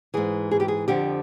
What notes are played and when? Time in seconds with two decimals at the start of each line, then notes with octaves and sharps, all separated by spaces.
0.14 G#2 E3 G#4
0.51 G#4
0.60 G4
0.68 G#4
0.88 F2 D3 F3 G4